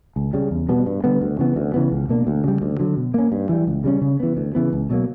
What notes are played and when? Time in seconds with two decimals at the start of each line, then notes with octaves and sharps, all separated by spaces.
0.16 C#2
0.33 C#3 G3
0.51 E2
0.69 B2 G3 B3
0.86 G2
1.04 D3 G3 B3
1.21 D2
1.39 C#3 E3 B3
1.56 D2
1.74 C#3 E3 B3
1.91 C#2
2.09 B2 A#3 D4
2.27 D2
2.44 C#3 G3
2.62 D2
2.80 D3 F#3
2.97 B2
3.14 A#3 C#4
3.32 G2
3.49 E3 G3
3.67 C#2
3.84 C#3 G3 C#4
4.02 C#3
4.20 E3 B3
4.37 D2
4.55 C#3 E3 B3
4.73 C#2
4.90 B2 F#3 A#3